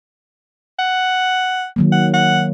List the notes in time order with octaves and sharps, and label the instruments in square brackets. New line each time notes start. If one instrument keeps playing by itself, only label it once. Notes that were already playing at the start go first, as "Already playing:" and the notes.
[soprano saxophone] F#5
[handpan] D#3 F#3 A#3
[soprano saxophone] F#5
F#5